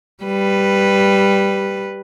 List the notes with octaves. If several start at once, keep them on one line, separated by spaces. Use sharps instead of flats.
G3 B4